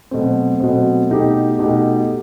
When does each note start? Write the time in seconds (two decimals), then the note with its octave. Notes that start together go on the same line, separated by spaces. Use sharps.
0.11 B2 F#3 A3 C4
0.60 B2 F#3 A3 C4
1.10 B2 A3 D#4 G4
1.59 B2 A3 D#4 G4